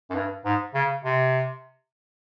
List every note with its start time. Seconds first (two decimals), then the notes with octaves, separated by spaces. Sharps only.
0.10 F#2
0.15 G2
0.45 G#2
0.75 C#3
1.04 C3